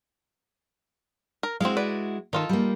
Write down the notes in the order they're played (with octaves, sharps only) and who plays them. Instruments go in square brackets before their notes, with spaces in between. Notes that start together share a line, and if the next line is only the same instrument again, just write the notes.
[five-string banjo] A#4
[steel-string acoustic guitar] G#3 E4 F#4 [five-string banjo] C4 F5
[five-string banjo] B4 D5
[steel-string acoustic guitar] D#3 [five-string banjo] D#4 F4 A4
[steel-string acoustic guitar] G3 A#3